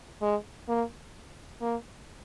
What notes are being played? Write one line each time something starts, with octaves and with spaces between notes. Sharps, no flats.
G#3
A#3
A#3